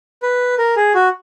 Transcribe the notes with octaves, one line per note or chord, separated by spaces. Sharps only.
B4
A#4
G#4
F#4